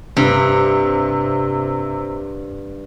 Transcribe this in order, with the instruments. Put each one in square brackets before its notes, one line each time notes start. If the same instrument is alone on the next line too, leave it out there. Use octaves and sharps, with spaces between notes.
[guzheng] G2 [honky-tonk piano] C3